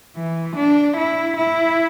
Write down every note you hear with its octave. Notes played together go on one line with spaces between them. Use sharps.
E3
D4
E4
E4